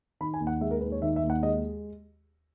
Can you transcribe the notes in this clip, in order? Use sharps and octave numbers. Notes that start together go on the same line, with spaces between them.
D#3 B5
G#5
D#2
F#5
G#3 E5
A#4
D#2 B4
C#5
D#3 E5
E5
D#2
F#5
G#3 D#5